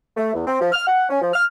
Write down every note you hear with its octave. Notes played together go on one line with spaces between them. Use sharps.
A3
E2
C4
F3
F6
F#5
C#4
F3
F6